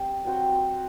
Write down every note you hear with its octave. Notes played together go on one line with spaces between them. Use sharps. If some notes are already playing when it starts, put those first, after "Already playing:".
Already playing: C4 G4 D5
F#3 C4 F#4 C5